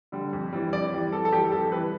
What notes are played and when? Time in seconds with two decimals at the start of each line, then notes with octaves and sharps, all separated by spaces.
0.12 D3 G3
0.33 F2
0.53 E3 G3
0.73 F2 D5
0.92 E3 G3
1.12 F2 A4
1.25 A4
1.32 E3 G3 G4
1.52 F2 A4
1.71 E3 G3 B4